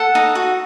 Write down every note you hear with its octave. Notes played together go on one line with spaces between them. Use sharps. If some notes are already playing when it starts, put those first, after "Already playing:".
Already playing: A4 F#5
D#4
F#4